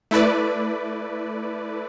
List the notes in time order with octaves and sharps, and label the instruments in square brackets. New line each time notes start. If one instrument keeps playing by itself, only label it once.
[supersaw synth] A3 E4 B4 D5